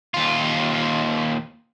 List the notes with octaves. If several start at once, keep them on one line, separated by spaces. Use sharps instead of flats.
D#2 F4